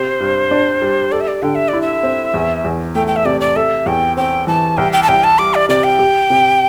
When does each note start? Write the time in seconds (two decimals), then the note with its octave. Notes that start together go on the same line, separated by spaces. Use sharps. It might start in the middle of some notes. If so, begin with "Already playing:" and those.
Already playing: C3 G4 C5
0.20 G2
0.51 D4
0.82 G3
1.12 A4 D5
1.21 E5
1.28 D5
1.42 D3 G5
1.55 E5
1.68 E4 D5
1.82 E5
2.03 C4
2.34 E2
2.64 E2
2.95 A3 G5
3.07 G5
3.16 E5
3.25 C3 D5
3.41 D5
3.56 A4 E5
3.86 E2 G5
4.17 C4 G5
4.47 E3 A5
4.77 C2 G5
4.93 G5
5.03 A5
5.08 C2 G5
5.24 A5
5.38 G3 D6
5.55 D5
5.69 C3 D5
5.84 G5
5.99 G4
6.30 C3